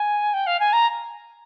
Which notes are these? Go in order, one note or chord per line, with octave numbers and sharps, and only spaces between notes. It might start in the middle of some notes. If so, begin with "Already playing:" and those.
Already playing: G#5
G5
F5
G#5
A#5